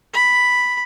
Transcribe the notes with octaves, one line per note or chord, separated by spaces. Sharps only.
B5